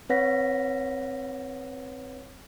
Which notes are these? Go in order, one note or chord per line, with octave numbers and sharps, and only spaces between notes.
C4 B4 C#5 F#5 A#6 B6